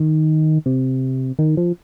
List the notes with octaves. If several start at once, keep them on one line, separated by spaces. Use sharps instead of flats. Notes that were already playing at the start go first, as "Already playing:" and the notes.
Already playing: D#3
C3
D#3
F3